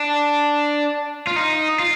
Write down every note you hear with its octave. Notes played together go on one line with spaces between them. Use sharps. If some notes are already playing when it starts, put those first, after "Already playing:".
Already playing: D4
F4
D#4
F4